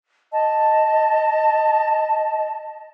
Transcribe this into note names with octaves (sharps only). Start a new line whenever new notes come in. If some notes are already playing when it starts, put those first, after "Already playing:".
D#5 A5